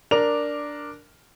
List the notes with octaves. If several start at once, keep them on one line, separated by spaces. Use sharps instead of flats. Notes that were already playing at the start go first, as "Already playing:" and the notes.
D4 A#4 D6 F7